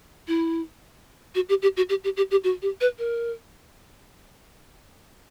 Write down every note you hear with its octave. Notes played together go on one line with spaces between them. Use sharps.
E4
F#4
G4
G4
F#4
G4
G4
G4
G4
F#4
G4
B4
A#4